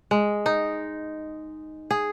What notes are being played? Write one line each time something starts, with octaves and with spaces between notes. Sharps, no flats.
G#3
D#4
G#4